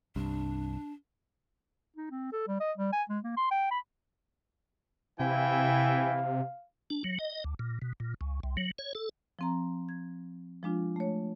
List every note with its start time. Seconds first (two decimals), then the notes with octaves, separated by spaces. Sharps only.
0.16 C2 G2 D4
1.96 D#4
2.11 C4
2.32 A4
2.47 G3
2.60 D#5
2.77 G3
2.93 G#5
3.09 G#3
3.24 A#3
3.37 C6
3.51 G5
3.71 B5
5.20 C3 E3 E4 F5 G5 G#5
6.90 D4
7.04 F#3
7.19 D#5
7.44 D2
7.59 A#2
7.82 B2
8.00 A#2
8.21 C#2
8.43 C2
8.57 F#3
8.78 C#5
8.95 A4
9.39 F3 C4 A#5
9.89 G#6
10.63 F3 G#3 D4 F4
10.96 A3 C#5